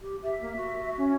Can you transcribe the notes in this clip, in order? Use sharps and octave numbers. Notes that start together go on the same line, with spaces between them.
G4
G4 E5
A#3
F#4
C#4